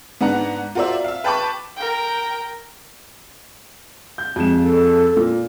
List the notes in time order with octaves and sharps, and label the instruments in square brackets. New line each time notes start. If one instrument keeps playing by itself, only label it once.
[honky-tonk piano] G#2 B3 D4 F#5 A#5
F4 F#4 A#4 C5 D5 E5
E5 F5
B4 G5 A5 B5 C#6 D6
[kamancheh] A#4 G5
[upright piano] G6
F2 G#3 E7
[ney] A4
[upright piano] A#2